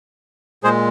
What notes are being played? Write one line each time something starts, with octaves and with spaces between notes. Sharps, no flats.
A#2 G#3 G#4 C5